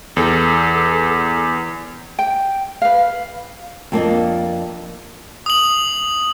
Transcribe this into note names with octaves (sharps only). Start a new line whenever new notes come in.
E2 A4
G5
B4 F5
F2 A#3 D4 D#5
D#6 F#7